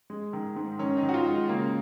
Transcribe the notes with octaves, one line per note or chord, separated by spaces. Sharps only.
G#3
D#3
G#2
D#3 C#4
D#4
D#3
F#4
F4
G#3
D#4
C#3 A#3